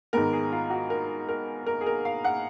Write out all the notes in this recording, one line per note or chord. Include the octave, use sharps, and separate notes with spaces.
G#2 D#3 G#3 B3 A#4
G#4
F4
F#4
A#4
A#4
A#4
G#4
A#4
F5
F#5